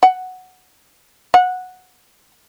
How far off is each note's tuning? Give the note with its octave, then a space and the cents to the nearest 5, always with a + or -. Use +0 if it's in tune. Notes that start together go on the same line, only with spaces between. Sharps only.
F#5 +0
F#5 -10